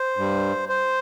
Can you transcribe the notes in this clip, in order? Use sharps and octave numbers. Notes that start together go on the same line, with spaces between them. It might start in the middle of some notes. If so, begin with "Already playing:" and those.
Already playing: C5
G2 G3
C5